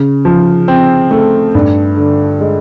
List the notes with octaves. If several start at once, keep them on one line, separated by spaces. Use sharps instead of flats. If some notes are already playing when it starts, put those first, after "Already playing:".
Already playing: C#3
F3
C4
A3
G2
D3
G#3